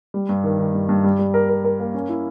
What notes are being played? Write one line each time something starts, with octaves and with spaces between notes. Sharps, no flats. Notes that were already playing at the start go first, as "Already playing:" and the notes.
G3
G2
D#3
D#3
G2
G2
G3
G3
A#4
A#4
A#4
A#3
C#4
E4